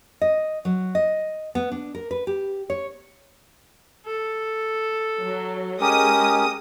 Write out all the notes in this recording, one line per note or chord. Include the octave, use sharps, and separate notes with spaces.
D#5
F#3
D#5
B3
D4
A#4
B4
G4
C#5
A4
F#3
G#3 C#4 G4 A#4 D#6